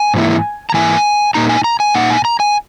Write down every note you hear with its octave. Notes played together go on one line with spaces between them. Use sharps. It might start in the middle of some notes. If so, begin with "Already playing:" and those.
Already playing: G#5
G#2 E3 A#3 E4
A#5
G#2 E3 A#3 E4 G#5
A#2 A#3 D#4 A#5
G#5
A#5
G#5
A#2 A#3 D#4 F#5
G#5
A#5
G#5